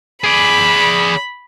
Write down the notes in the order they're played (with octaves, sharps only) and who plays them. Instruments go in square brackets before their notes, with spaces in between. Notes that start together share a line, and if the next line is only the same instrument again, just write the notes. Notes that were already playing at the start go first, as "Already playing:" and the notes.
[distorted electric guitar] G#4 D5 [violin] B5